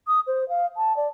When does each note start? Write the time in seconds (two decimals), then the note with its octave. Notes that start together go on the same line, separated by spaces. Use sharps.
0.08 D#6
0.27 C5
0.49 F5
0.77 A5
0.97 D5